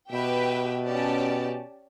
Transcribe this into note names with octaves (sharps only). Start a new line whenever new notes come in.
B2 G4 B4 E5 G5
C#4 G4 D5 A5